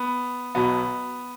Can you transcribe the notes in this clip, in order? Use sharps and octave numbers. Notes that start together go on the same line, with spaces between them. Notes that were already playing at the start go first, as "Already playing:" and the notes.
Already playing: B3
B1 B2 F#3 B3